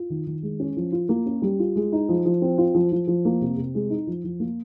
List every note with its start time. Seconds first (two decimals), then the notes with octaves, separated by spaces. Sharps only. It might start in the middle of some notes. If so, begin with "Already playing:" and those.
Already playing: F4
0.10 D#3
0.27 D#3
0.43 G#3
0.60 C#4
0.77 F3
0.92 F4
1.09 A#3
1.26 C#4
1.42 G3
1.59 F4
1.76 G#3
1.92 D#4
2.09 F3
2.26 F3
2.42 C4
2.58 F4
2.75 F3
2.92 F3
3.07 F3
3.25 A#3
3.41 C3
3.57 C3
3.75 G#3
3.90 D#4
4.07 F3
4.24 F3
4.40 A#3